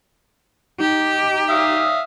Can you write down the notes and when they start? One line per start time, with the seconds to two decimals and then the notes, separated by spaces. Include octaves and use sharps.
0.80 D#4 G4
1.49 E5 F5 D#6